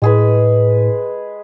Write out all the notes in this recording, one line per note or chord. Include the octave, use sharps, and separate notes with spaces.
A2 G#3 G#4 B4